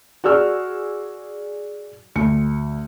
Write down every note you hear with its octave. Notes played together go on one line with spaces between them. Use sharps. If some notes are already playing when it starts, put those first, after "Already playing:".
F#4 G#4 D5 E6 F6
D2 C#7